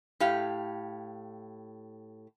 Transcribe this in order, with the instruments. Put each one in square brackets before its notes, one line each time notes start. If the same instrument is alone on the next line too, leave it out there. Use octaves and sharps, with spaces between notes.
[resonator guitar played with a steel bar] A2 G4 F5